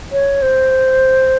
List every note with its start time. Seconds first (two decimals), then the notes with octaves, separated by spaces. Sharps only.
0.12 C#5
0.42 C5